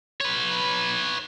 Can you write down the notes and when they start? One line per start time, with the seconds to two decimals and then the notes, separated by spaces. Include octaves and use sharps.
0.21 B4 C#5